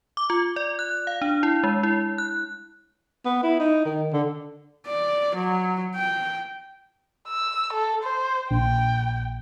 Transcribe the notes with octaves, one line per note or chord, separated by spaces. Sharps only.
D6
F4
D5
F#6
F5
D4
E4
G#3
E4
F#6
B3
E4
D#4
D#3
D3
D5
F#3
G5
E6
A4
C5
A#1 G5